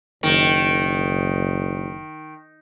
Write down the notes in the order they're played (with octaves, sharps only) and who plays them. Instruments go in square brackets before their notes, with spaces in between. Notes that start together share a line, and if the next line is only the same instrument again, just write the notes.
[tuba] F#1 [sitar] D#3